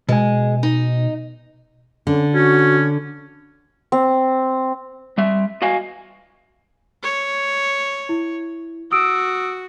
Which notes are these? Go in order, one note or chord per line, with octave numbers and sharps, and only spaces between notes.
B2 G#3 G#5
D#4
D3 C#4
C#4 F#4
C4
G3 E5
F#4 D#5 F5 G#5
C#5
E4
F#4 D#6 E6 D7